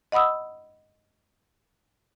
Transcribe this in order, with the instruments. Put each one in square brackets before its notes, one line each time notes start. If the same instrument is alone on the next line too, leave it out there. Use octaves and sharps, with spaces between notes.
[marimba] D#5 F#5 B5 D#6 E6